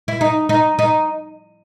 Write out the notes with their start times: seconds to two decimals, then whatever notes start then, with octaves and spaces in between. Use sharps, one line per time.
0.08 E4
0.21 D#4
0.49 D#4
0.79 D#4